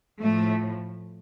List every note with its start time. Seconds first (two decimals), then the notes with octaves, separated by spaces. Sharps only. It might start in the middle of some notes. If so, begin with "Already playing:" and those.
0.22 A2 F3 A3